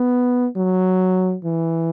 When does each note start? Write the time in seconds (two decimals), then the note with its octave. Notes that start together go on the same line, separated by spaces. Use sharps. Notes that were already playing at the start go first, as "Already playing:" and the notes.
Already playing: B3
0.56 F#3
1.45 E3